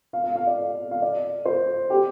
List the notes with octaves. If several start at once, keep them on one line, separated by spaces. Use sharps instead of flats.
F5
F5
F5
D5
F5
D5
C5
G4